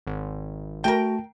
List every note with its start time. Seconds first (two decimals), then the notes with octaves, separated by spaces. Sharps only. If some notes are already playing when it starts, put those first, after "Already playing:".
0.07 G#1
0.84 A3 F#4 A#4 G5 A5